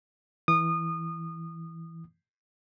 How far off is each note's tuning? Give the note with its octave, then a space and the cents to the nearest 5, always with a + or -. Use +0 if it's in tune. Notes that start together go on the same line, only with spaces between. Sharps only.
E3 +0 D#6 -25